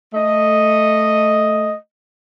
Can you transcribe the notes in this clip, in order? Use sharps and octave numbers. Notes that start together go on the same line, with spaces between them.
A3 D#5